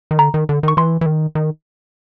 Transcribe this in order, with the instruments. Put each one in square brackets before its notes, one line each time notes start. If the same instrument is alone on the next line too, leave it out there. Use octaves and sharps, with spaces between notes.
[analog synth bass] D#3
[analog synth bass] D3 [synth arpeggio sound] A#5
[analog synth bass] D#3
D3
[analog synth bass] D#3 [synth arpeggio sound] C#6
[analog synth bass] E3 [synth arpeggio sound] C6
[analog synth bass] E3
D#3
D#3